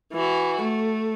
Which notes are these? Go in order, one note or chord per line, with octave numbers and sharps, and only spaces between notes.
E3 F#4
A3